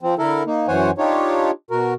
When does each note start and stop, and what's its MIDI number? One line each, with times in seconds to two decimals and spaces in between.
0.01 0.15 53
0.01 0.15 60
0.19 0.43 50
0.19 0.43 64
0.19 0.43 69
0.19 0.43 70
0.46 0.67 58
0.46 0.67 63
0.68 0.91 42
0.68 0.91 52
0.68 0.91 72
0.68 0.91 73
0.68 0.91 78
0.68 0.91 80
0.98 1.51 62
0.98 1.51 63
0.98 1.51 65
0.98 1.51 67
0.98 1.51 73
1.71 1.94 47
1.71 1.94 66
1.71 1.94 70